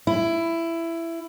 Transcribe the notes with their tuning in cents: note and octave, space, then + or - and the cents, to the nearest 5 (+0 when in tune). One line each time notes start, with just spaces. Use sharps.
E4 +15